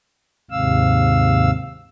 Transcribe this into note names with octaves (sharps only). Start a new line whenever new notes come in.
D#2 G#2 C3 F5 E6